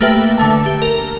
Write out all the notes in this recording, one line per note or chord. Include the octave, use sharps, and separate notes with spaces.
A3 A#3 G4 B4 E5 G5
D3 A3 A5
G4
A#4